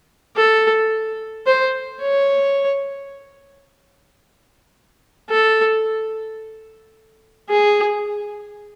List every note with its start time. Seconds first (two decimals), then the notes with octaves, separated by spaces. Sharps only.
0.36 A4
1.47 C5
2.01 C#5
5.30 A4
7.49 G#4